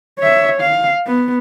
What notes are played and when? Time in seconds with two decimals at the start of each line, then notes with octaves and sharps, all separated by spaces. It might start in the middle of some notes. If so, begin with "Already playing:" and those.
0.19 C#5 E5
0.61 F5
1.06 B3